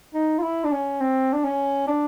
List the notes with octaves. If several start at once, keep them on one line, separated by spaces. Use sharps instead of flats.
D#4
F4
E4
D4
C#4
C4
D4
C#4
D4